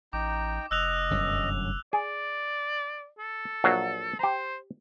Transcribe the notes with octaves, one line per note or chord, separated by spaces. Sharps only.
A1 D#4 G5 A#5 D6
F1 D#5 E6 F#6 F7
G1 F#2 F#3
G#4 D5
A4
A#1 F#3 F5
G4 C5 A#5